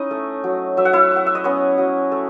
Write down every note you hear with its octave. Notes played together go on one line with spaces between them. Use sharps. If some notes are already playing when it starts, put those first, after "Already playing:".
Already playing: C#4 D#4 E4 D#5
A3
F#3
F#3 E5
F#5
E4 E5
E4 F#5
E5
D#5
B3 C#4 C#5
F#3
A3